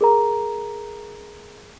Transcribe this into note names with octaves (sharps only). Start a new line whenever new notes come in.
G#4 A#4 A#5